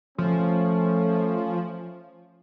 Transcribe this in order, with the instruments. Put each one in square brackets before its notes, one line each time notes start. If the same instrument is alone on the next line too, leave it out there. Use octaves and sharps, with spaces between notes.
[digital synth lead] F3 [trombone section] A3 C#4